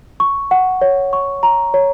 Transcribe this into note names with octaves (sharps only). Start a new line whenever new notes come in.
C#6
F#5
C#5
C#6
A#5
C#5